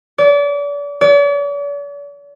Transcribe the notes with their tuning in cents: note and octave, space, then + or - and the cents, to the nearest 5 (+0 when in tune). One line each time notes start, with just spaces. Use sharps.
D5 -35
D5 -45